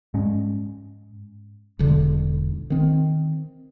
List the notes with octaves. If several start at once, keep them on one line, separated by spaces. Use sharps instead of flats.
G#2 G#3 C#4
E1 B1 D3
D#3 C4